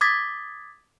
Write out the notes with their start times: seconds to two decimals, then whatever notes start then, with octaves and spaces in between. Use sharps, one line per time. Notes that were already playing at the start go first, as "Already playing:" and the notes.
0.01 D6 D#6 G#6 A6 B6